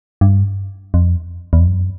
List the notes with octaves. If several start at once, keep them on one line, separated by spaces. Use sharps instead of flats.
G2
F2
E2
F2
F#2